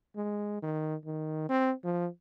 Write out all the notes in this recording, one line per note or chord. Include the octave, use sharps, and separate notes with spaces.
G#3
D#3
D#3
C4
F3